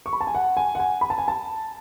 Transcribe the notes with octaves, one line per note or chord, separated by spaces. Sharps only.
C#6
B5
A5
G#5
F#5
G#5
F#5
G#5
B5
A5
G#5
A5